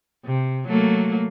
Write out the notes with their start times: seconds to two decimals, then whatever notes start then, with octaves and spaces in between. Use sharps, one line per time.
0.25 C3
0.67 F#3 A3 A#3